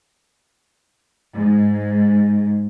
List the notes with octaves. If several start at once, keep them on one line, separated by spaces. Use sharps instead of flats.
G#2